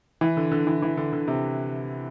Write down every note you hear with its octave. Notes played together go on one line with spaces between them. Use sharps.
E3
D3
D3
E3
E3
D3
D3
C3